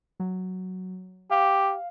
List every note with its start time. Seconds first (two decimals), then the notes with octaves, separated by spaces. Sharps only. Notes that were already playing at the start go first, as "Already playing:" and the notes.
0.20 F#3
1.31 G4 F5